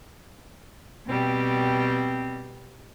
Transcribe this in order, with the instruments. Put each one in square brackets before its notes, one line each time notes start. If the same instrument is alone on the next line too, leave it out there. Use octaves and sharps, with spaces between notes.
[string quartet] B2 G3 [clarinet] C4